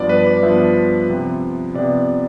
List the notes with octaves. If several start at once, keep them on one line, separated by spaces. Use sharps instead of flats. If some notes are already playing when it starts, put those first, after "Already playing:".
Already playing: G2 F3 B3 D4 D5
B4
D5
G2 F3 B3 D4 E5
C3 F3 B3
C3 F3 B3 D5